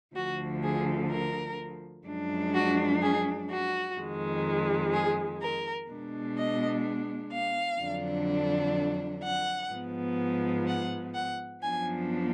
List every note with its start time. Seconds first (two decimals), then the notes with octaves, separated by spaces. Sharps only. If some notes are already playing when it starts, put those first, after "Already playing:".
0.15 D2 D3 F3 F#4
0.63 G#4
1.11 A#4
2.06 F#2 F3 G#3 D4
2.54 F#4
3.02 G#4
3.50 F#4
3.98 F2 D#3 G#3
4.93 G#4
5.41 A#4
5.88 B2 G#3 B3 D4
6.36 D#5
7.32 F5
7.80 F2 D3 F#3 D4
9.23 F#5
9.71 G#2 F3 B3
10.67 F#5
11.14 F#5
11.62 F#2 F3 B3 D4 G#5